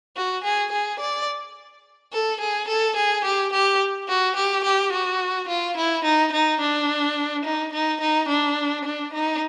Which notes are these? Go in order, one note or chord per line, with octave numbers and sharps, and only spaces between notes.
F#4
G#4
G#4
D5
A4
G#4
A4
G#4
G4
G4
F#4
G4
G4
F#4
F4
E4
D#4
D#4
D4
D#4
D#4
D#4
D4
D4
D#4